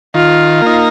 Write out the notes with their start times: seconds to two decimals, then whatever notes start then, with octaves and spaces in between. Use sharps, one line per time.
0.14 D#3 F4
0.62 A#3 D#4